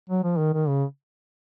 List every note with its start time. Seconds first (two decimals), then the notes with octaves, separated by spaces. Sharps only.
0.09 F#3
0.24 F3
0.38 D#3
0.53 D#3
0.69 C#3